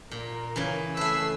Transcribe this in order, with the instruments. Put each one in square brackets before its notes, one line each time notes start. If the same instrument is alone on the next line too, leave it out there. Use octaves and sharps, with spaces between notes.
[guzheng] A#2 [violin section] A#4
[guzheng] C#3 E3
[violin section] A3 E6 C7 [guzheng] B4 E5